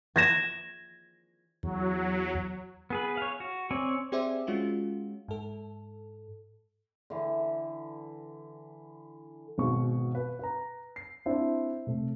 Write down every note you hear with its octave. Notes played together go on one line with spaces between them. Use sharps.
G#6 A#6 E7
E2 F#3
B3 G#4 B4
C#5 F5
F#4
C4 C#5 D5 G#5
C4 G4 G#4 C5 D5 E5
G#3 C#4 F4 F#4
G#2 A4
D3 E3
G#1 B2 G#4 C#6
B4
B4 A#5
C7
C4 D4 E4 C5
C3 A3